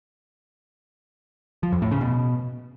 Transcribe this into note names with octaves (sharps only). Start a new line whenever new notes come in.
F3
F2
A2
C#3
B2